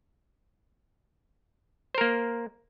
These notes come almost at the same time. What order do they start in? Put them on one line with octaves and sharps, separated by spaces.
C5 A#4 A#3